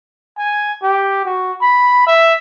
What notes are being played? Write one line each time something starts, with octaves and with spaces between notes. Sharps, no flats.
G#5
G4
F#4
B5
E5